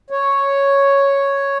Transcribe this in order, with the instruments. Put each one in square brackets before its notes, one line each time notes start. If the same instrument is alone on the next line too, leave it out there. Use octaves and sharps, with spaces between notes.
[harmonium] C#5